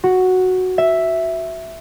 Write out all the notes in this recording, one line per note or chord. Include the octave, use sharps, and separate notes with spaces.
F#4
E5